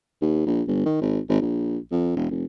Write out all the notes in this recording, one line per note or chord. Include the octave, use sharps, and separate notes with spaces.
D#2
A#1
G1
D#3
G#1
G#1
A#1
F2
E1
F1